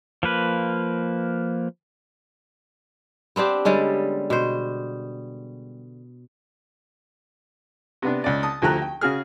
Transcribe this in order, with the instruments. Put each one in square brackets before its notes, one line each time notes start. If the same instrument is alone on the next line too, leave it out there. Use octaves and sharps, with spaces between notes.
[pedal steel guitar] F3 A#3 B4
[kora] B3 C4 D4 G4
D3 G3 G#3 C#4
B2 C5
[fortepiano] C3 B3 D4
C#2 D5
A5 D#6
D2 F3 A3 G4 A#5 F#6
G5
C#3 F#4 G#4 F6